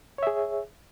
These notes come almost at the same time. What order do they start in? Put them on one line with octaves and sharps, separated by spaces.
C#5 E5 G#4